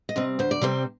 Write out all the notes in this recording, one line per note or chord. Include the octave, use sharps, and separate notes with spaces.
D#5
C3 G3 C4
D2 C5
D5
C3 G3 C4 C5